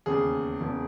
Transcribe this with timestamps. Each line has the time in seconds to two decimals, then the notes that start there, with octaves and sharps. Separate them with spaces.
0.06 E1 D#2 C#3 G#4
0.61 E1 C#3